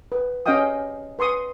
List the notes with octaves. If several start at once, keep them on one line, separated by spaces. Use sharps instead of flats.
B4
C#4 G4 D#5 F5 G5 D#6
B4 C6 C#6 D#6